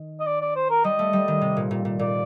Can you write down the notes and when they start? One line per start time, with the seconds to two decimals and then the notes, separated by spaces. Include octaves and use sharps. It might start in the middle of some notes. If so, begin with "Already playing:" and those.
Already playing: D#3
0.20 D#5
0.26 D5
0.41 D5
0.55 C5
0.70 A#4
0.84 G3 D#5
0.99 A3
1.13 G3
1.28 D#3
1.41 C3
1.57 A#2
1.71 A#2
1.85 A#2
1.99 A#2 D5